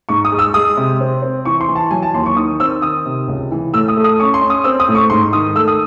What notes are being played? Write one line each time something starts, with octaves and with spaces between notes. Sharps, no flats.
G#2 C#6
D#6
G#3
E6
G#3 D#6
C3
C4
C4
E3 C#6
C6
E3
A5
F#3 G#5
A5
D#2 C6
C#6
D#3 D#6
C4 E6
D#3 D#6
C3
C#2
E3
A2 E6
D#6
A3
D#6
C#4 C#6
C6
C#4
D#6
C4 E6
D#6
A2
C#6
G#2 C6
D#3 D#6
A3 E6
D#6